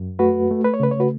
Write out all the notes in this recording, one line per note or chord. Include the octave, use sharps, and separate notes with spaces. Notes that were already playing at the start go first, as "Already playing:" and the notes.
Already playing: F#2
A3 F#4 B4
A3
B4
C#5
C#3 B4
C#5
F#4 B4